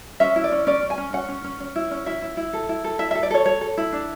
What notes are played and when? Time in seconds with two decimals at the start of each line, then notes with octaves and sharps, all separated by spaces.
0.20 C#4 E5
0.36 E4
0.44 D5
0.52 C#4
0.67 C#4 D5
0.83 C#4
0.90 G#5
0.98 C#4
1.13 C#4 F#5
1.29 C#4
1.44 C#4
1.60 C#4
1.76 E4
1.91 C#4
2.06 E4 E5
2.22 E4
2.37 E4
2.53 A4
2.69 E4
2.84 A4
2.99 E4 E5
3.11 A4 E5
3.23 D5
3.31 A4 C#5
3.46 A4 C#5
3.61 A4
3.78 E4
3.93 D4